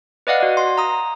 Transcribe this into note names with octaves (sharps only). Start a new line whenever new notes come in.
B4 D5 D#5 F5 F#5
F#4 D5
C6
A#5 D#6